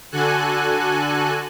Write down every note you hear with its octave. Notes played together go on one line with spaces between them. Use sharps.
D3 F#4 A4 G#5 F#6